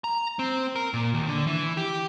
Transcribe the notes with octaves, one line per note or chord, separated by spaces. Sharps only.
A#5
C4
A#4
A#2
D#2
D3
E3
G4